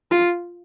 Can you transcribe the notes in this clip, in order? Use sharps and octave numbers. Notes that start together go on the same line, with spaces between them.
F4